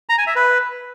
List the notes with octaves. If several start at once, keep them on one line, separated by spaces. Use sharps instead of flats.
A#5
G#5
E5
B4